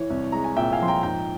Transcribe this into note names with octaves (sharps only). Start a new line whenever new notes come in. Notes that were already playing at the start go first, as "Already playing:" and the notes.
Already playing: E3 C#5
C2
G#3 A#5
G#5
A#2 E5 G5
F5 G#5
F3 C6
G5 A#5
G#2 G5 A#5